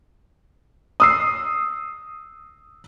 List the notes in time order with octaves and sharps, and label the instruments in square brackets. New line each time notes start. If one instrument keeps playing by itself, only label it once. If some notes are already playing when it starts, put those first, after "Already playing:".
[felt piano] D#6 E6 C7